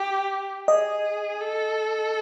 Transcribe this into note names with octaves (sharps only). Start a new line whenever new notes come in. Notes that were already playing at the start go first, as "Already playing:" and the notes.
Already playing: G4
G#4 D#5
A4